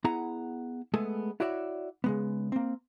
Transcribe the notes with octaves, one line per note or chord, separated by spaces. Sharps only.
B3 E4 G#4 F#5 A#5
G#3 A3 B3 G#4 A4
E4 F#4 C#5 D5 E5 F#5
C#3 G#3 B3
A#3 C4